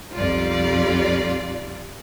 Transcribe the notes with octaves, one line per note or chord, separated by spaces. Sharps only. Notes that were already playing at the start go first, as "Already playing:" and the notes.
B1 F2 G3 F4 D5